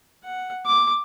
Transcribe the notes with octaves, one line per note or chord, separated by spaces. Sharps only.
F#5
D6